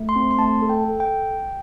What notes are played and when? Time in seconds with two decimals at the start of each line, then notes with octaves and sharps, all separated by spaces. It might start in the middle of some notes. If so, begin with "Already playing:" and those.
Already playing: A3
0.09 C6
0.16 C4
0.31 C6
0.39 A3 A5
0.62 A4
0.69 G5
0.85 A4
1.00 G5